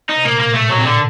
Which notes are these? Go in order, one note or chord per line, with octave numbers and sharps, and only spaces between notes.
D#4
C3
A#2 A#3
A2 A#3
A#2
A3
A2
A#2 F#3
A2 C3
A#2 D3